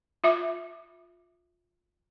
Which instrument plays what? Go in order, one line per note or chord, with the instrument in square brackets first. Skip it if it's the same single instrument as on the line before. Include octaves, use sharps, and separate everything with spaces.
[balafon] F4 E5 D6